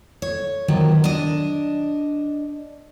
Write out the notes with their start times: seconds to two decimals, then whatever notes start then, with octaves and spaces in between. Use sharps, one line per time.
0.22 C#5
0.68 D#3 F3 F#3 A#3
1.04 D4 D#5